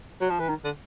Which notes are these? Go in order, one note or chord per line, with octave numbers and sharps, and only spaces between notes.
F#3
F3
E3
D#3
D3